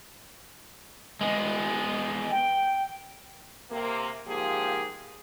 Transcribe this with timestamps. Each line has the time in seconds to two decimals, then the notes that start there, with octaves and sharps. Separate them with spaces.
1.21 G#3 B3
2.31 G5
3.71 C3 A#3
4.27 G#2 F3 A#3 G4 G#4